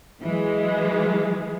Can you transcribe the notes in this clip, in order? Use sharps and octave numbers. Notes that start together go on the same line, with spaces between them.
E3 F#3 G#3